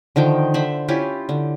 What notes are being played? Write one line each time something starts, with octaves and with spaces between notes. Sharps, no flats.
D3 D#3 F3 G5
D3 C5 E5 B5
C#4 E4 F4 G4
D3